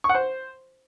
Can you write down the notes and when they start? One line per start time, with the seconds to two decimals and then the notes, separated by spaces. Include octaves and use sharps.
0.04 C#6
0.09 F#5
0.15 C5